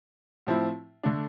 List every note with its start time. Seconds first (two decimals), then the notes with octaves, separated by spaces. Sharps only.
0.47 A2 F3 C4 E4
1.03 D3 A3 D4